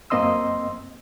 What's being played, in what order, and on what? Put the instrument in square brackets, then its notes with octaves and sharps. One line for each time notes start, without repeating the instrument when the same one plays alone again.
[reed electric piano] F#2 A#3 C4 D#5 C6 E6